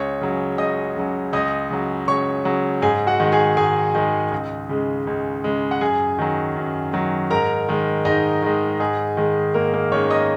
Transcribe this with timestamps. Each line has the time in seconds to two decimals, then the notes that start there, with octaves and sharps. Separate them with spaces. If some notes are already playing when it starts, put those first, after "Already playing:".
Already playing: C#2 C#5 C#6
0.21 C#3 F#3
0.58 C#2 D#5 D#6
0.96 C#3 F#3
1.33 C#2 D#5 D#6
1.70 C#3 F#3
2.08 C#2 C#5 C#6
2.45 C#3 F#3
2.82 G#2 G#4 G#5
3.07 F#4 F#5
3.20 D#3 G#3
3.32 G#4 G#5
3.57 G#2 G#4 G#5
3.95 D#3 G#3
4.31 C#2
4.69 C#3 G#3
5.07 C#2
5.44 C#3 G#3
5.71 F#5
5.81 F#2 G#4 G#5
6.19 D#3 F#3
6.56 F#2
6.93 D#3 F#3
7.30 G#2 A#4 A#5
7.69 D#3 G#3
8.05 G#2 D#4 D#5
8.42 D#3 G#3
8.80 G#2 G#4
9.17 D#3 G#3
9.54 G#2 A#3 A#4
9.73 A#3 A#4
9.92 D#3 G#3 C#4 C#5
10.10 D#5 D#6